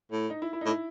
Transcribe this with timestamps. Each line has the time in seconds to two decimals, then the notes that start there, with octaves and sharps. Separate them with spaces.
0.12 A2
0.30 D#4
0.42 E4
0.53 E4
0.61 D#4
0.66 A2
0.69 E4